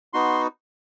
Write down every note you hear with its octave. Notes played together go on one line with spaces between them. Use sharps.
B3 D#4 F#4 C6